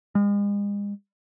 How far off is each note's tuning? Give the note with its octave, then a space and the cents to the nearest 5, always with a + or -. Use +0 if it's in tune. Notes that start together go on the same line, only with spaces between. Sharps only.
G#3 -40